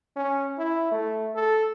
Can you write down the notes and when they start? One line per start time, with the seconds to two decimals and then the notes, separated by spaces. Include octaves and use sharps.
0.16 C#4
0.58 E4
0.92 A3
1.35 A4